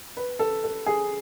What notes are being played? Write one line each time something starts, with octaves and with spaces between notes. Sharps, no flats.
B4
A4
A4
G#4